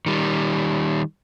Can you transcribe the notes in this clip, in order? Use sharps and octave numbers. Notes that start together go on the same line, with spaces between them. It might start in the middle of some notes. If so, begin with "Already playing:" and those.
D#3 G3